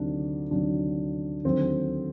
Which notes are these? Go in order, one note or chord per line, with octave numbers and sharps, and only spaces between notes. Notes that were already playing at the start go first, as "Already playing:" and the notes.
Already playing: D2 C3 D#3 F#3 D4
D2 C3 D#3 F#3 D4
D#2 D3 F#3 C4